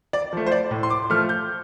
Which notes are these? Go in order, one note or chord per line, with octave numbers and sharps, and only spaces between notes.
D5
F3 A3
C5
D5
A2
C6
D6
F3 A3 F6
G6